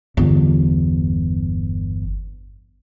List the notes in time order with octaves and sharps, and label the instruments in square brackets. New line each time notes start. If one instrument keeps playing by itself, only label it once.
[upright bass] G1 E2